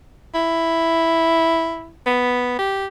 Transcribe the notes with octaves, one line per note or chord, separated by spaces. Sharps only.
E4
B3
G4